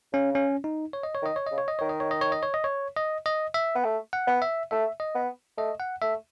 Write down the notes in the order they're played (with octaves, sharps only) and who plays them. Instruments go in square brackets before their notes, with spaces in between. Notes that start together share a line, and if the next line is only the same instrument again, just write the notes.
[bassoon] C#3 [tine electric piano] C#4
[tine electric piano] C#4
D#4
C#5
D#5
C#5
[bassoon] D#3 [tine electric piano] D#5
[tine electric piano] C#5
[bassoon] C#3 [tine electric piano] D#5
[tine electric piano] C#5
D#5
[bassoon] D#3 [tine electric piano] C#5
[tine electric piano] D#5
C#5
D#5
C#5
D#5
C#5
D#5
C#5
D#5
D#5
E5
[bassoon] B3
A3
[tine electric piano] F#5
[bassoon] B3
[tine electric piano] E5
[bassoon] A3 [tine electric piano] E5
[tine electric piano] D#5
[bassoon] B3
[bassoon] A3 [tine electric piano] D#5
[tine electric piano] F#5
[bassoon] A3 [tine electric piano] E5